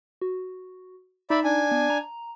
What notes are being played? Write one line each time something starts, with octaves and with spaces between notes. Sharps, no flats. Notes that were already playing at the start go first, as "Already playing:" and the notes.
F#4
D#4 D5 E5 B5
D4 G#5
B3
A#5